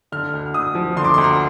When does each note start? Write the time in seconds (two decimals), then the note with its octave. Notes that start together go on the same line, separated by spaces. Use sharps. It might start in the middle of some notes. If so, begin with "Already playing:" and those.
0.12 D3 F6
0.33 D2
0.54 D2 D#6
0.75 F3
0.96 D3 C6
1.04 D6
1.14 D2 C6
1.24 A#5